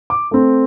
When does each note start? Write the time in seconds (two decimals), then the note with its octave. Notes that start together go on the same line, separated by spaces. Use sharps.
0.10 D6
0.31 A3 C4